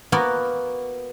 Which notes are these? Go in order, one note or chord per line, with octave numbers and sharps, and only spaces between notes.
A#3 B3 F#4 A#4